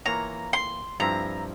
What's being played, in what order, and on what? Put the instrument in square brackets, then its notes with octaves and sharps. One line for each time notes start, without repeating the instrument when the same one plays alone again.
[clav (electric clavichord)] E3 A#3 F4 A#4 C#5 [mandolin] A#5
[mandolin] C6
[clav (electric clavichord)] G2 F3 C4 E4 [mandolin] A#5